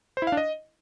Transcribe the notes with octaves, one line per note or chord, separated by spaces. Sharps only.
C5
E4
F5
D4
D#5